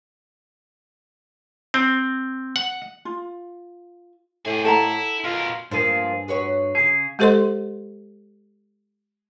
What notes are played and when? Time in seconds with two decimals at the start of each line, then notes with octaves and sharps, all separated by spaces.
1.74 C4
2.56 F#5
3.05 F4
4.45 A2 G4 G#5
4.65 E4 A4 F#5 A#5
5.24 B2 F4 A#4
5.71 G2 F3 A#3 G#4
6.28 F#4 B4 C#5
6.75 C#3 G#4
7.19 G#3 G4 A4 C5 D#5 C6